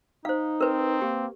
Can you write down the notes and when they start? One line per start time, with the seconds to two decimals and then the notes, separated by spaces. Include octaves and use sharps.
0.25 D#4 C5 F5
0.61 C4 A#4 B4
1.02 A#3 G4